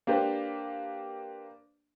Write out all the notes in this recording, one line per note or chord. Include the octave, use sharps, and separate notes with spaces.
A#3 D4 G4 B4 C5